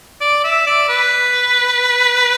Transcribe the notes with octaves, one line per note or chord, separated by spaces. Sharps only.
D5
E5
D5
B4